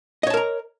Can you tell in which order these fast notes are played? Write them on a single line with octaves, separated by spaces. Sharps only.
D#5 C#5 A5 A#4 A#5